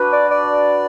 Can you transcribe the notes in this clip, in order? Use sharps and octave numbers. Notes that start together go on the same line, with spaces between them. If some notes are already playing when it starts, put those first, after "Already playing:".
Already playing: D4 F#4 B4
D5
D5